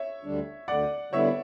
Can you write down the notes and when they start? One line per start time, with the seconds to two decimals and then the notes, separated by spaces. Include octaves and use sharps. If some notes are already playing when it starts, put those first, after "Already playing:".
Already playing: C#5 E5
0.24 D2 D3 G3 D4
0.68 D2 D3 A3 D5 F#5
1.12 D3 G3 B3 E4 C#5 E5